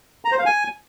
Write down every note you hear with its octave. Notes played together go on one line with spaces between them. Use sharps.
A#5
C5
F5
G#5